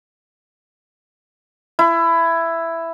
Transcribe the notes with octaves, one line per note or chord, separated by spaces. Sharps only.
E4